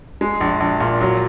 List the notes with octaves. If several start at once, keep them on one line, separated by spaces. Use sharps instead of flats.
G#3
A#1
A#1
A#2
F#3